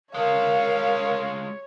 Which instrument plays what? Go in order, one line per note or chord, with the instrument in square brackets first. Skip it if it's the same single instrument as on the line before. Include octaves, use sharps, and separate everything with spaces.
[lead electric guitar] G#3 F4 [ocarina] A#4 [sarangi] C#5 [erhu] F5